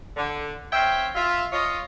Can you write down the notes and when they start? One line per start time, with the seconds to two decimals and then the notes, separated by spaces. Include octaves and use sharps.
0.17 D3
0.73 C4 C#5 E5 F5 G5
1.15 F4 E5
1.52 F4 C#5 D#5